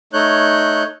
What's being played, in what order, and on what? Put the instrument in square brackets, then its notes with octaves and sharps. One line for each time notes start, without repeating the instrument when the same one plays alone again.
[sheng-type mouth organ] A3 D#4 C#5 F#6 G6